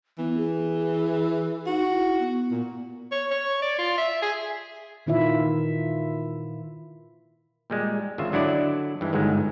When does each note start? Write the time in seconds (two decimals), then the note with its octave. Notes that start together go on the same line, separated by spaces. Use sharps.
0.18 E3 B3
0.37 G#4
1.66 D#4 F#4
1.90 E4
2.20 B3
2.51 A#2
3.12 C#5
3.31 C#5
3.62 D5
3.78 F4
3.98 E5
4.22 G#4
5.07 A#2 D#3 E4 F4 E5
7.70 A#2 G3 G#3
8.18 G#1 C#3 F4 E5
8.32 D3 F#3 D4 E4 D5 D#5
9.01 G2 E3 G#3
9.13 G1 G#2 F#3 G#3 A3